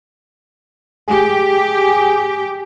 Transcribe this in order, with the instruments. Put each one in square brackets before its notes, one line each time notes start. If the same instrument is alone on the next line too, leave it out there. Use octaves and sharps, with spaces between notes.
[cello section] G4 [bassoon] G#4